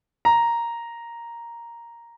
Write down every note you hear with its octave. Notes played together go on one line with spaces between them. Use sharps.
A#5